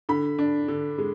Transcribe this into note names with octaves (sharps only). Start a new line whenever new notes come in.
D3 B5
D4
D3
G#3